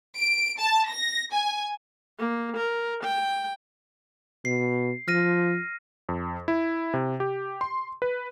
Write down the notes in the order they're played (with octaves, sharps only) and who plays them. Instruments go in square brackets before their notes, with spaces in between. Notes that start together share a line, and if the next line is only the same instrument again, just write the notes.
[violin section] D7
A5
A#6
G#5
[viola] A#3
A#4
G5
[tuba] B2 [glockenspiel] C7
[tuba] F3 [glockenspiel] F6 A#6 D#7
[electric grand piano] F2
E4
C3
G4
C6
B4